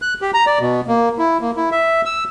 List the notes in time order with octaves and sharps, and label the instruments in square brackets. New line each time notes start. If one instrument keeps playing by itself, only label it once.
[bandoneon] F#6
G4
A#5
D5
B2
A#3
E4
A#3
E4
E5
E6